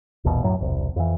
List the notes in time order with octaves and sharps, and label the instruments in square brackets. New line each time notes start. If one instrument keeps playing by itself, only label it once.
[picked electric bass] D#1 A#1 E2 B2
D1 F#2 A2 F#3
E1 C2
F2 E3